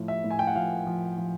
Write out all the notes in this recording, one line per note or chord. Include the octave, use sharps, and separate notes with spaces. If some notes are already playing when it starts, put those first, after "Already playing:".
Already playing: A2 F3
E5
A2
G#5
G5
F#5
F3 F5
F3
F3